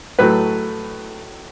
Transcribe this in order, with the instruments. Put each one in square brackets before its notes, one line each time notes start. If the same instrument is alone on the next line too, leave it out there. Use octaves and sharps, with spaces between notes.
[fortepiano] A2 F#3 A3 B4